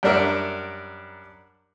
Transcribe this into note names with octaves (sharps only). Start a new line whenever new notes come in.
F#2 G3 D4 A#4 E5